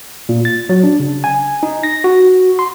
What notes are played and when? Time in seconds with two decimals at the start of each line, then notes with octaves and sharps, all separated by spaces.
0.29 A#2
0.45 A6
0.69 F#3
0.84 D4
1.00 C#3
1.24 G#5
1.63 D#4
1.83 A#6
2.04 F#4
2.59 C6